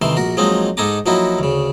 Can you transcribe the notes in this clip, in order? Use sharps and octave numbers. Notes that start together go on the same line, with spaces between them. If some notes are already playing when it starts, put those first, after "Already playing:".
C3 D#3 E3 A3 C6
A#1 F#4 A#4
F3 F#3 G#3 A#3 C4 D#4
G#2 D#4 A4 G#5 A#5 D6
F3 F#3 A#3 D#4 E4 F#4
D2 C#3